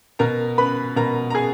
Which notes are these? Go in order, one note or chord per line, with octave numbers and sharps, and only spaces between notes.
B2 A#4 A#5
B4 B5
B2 A#4 A#5
A#5
G#4 G#5